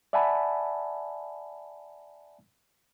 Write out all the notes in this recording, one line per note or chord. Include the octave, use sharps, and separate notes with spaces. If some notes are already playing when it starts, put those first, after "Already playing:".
D5 E5 F#5 G#5 A5 B5